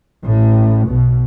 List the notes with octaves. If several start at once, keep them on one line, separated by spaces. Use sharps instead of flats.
A1 A2
B1 B2